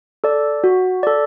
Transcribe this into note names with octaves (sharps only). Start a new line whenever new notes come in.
A4 D5
F#4
A4 D5